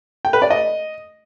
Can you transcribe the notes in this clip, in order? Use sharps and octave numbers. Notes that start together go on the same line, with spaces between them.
G5
B4
D5
D#5